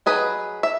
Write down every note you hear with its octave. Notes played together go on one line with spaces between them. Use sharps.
F#3 A3 D#4 G#4 B4
E5